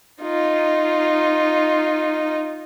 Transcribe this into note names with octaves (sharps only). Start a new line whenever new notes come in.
D#4 F4